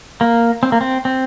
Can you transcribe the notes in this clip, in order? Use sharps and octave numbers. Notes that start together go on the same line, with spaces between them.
A#3
C4
A#3
C4
C4